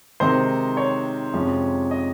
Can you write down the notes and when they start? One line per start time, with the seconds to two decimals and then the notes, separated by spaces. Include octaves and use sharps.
0.20 C3 D#3 G#3 C4 D#4 C5
0.77 C#5
1.34 F2 C3 F3 G#3 C#4
1.91 D#5